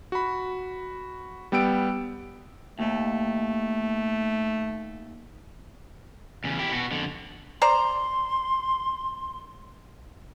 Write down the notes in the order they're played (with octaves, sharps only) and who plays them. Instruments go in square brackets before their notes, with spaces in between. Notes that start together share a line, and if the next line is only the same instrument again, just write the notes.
[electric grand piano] F#4 B5
G3 B3 G5 E6 D7
[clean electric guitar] D#2 [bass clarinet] A3
[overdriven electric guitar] E2 C#3
E4 G4
B2 F#4
F2 D3
[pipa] C5 D5 A#5 [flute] C6